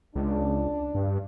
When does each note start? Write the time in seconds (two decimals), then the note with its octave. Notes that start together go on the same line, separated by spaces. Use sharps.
0.15 C#2 D4
0.95 G2